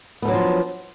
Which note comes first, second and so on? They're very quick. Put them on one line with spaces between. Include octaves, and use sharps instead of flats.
B3 A3 F#3 D4 F3